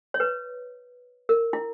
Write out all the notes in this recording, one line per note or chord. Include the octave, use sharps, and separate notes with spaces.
C#5
B4
A#4
E4